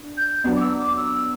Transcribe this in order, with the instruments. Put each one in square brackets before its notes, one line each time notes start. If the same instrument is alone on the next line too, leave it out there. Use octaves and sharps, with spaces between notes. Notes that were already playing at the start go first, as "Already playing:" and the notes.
Already playing: [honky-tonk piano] D4
[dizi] G6
[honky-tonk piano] F#3 B3 D4
[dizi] D6
E6
D6
E6